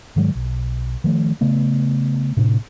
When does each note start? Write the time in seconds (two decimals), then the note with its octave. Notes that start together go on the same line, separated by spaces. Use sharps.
0.16 G#2 D#3 F#3 G#3
0.35 B1
1.04 D#3 F3 A3
1.41 C#3 A3 B3
2.37 A2 C3 D4